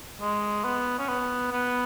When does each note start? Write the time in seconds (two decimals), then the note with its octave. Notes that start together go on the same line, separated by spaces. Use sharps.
0.21 G#3
0.64 B3
0.99 C#4
1.09 B3
1.51 B3